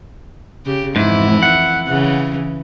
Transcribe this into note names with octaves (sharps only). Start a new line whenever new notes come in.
C#3 G4
F2 G#2 E3 E4
F#5
C#3 E3